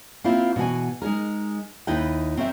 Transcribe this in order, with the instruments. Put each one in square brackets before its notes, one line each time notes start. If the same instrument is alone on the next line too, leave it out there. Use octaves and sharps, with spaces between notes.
[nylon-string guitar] A#3 C4 E4 F4
B2 E3 F#4 G#5
G#3 D#4 G#4 A#4
D#2 D#4 E4 B4 G5
C4 C#4 A#4 C5 E5